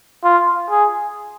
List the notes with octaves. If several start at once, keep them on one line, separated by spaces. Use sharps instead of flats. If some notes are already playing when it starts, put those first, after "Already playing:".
F4
G#4